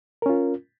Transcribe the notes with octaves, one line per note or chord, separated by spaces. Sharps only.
C#4 F4 A#4